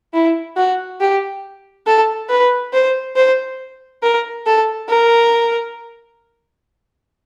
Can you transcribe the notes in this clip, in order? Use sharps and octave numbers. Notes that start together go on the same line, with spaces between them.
E4
F#4
G4
A4
B4
C5
C5
A#4
A4
A#4